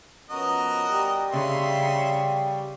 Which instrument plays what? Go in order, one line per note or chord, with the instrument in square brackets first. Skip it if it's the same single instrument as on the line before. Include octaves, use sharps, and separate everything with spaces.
[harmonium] F3 B3 C#4 [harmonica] F#4 A#4 D#5
[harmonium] G3 G4
[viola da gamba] C#3 [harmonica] E5 C6